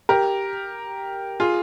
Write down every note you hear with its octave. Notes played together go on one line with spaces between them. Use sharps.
G4 A#4
F4 G#4